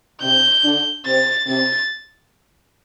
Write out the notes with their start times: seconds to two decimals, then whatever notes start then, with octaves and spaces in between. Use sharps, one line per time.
0.21 C3 C4 G6
0.64 D3 D4
1.05 C3 C4 A6
1.47 C3 C4 A6